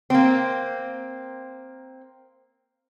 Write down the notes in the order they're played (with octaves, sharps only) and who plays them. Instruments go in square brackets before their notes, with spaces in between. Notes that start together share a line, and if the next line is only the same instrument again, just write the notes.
[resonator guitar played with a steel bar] A#3 C4